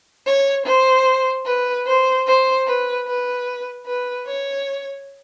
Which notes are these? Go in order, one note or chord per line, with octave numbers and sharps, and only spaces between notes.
C#5
C5
B4
C5
C5
B4
B4
B4
C#5